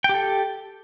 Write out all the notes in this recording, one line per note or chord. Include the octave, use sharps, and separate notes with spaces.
G4 A4 G5